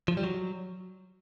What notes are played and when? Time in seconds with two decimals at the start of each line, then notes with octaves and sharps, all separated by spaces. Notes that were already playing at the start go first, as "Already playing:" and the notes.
0.08 F3
0.17 G3
0.24 F#3